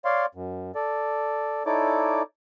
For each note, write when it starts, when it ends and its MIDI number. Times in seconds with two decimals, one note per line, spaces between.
0.05 0.26 73
0.05 0.26 74
0.05 0.26 77
0.05 0.26 84
0.35 0.72 42
0.75 1.63 69
0.75 1.63 74
1.66 2.22 63
1.66 2.22 64
1.66 2.22 69
1.66 2.22 73
1.66 2.22 74
1.66 2.22 86